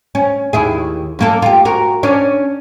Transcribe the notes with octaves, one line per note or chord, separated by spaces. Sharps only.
C#4
D#2 E4 G#4
F#2 A#3 A4
F4 G4
F#4 A#4
C#4 D4